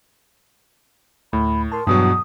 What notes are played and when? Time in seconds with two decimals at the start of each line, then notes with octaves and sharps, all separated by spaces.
1.33 D2 A2 A3 B5
1.72 A#4 A5 C6
1.87 E2 G2 B2 F#3 D#6